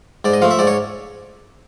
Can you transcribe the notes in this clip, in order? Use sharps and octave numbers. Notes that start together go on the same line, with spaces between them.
G#2 D5
D#5
F3 A3 F5
E5
G#2 D5
C#5